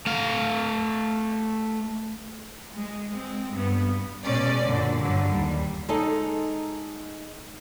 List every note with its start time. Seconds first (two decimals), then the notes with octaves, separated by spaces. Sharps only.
0.06 A3 F5
2.74 G#3
3.11 G#3 C4
3.52 G2 B3
4.26 B2 G#3 C#4 D5
4.65 F#2 A#2 D3
5.00 G2 D3 F#3
5.28 D#2 G3
5.89 G#3 D#4 A4